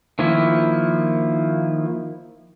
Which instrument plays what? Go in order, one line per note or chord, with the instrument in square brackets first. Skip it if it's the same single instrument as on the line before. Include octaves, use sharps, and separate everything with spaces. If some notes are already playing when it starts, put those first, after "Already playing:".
[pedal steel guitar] D#3 F3 A#3 E4